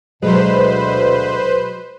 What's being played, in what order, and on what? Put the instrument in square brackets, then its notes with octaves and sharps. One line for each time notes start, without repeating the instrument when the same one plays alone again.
[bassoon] D2 [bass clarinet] B2 [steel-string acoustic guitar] F#3 G#3 [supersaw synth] B4 C5